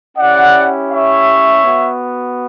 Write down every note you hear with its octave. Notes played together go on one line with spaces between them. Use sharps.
C#4 E4 G4 D5 F#5
C#5 E5
B3 F#4